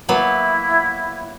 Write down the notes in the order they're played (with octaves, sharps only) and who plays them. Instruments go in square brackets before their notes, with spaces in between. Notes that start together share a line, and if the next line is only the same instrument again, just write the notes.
[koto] F#3 A#3 B3 [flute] E4